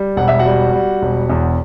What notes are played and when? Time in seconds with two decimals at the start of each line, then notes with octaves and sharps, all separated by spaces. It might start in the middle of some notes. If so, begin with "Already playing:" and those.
Already playing: G3
0.17 E1 F#5
0.28 E5
0.39 F#4 F#5
0.45 G3
0.73 G3
1.02 E1
1.29 E2